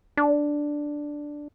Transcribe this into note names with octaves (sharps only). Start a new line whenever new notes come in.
D4